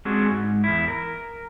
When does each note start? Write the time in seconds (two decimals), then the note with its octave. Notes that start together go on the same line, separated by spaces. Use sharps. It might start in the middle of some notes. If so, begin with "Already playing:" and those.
0.05 G#3 C4 D4 F#4 G#4
0.31 G#2
0.64 E2 E4
0.88 A#4